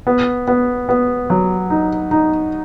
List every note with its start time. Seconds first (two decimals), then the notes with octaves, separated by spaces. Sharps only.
0.07 B3
0.48 B3
0.89 B3
1.30 F#3
1.70 D#4
2.11 D#4